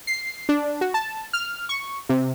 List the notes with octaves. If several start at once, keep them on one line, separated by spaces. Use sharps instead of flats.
C7
D4
F#4
A5
F6
C#6
C3